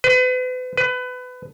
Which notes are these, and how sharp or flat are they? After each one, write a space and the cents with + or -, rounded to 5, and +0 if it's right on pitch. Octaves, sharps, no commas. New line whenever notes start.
B4 +40
B4 +25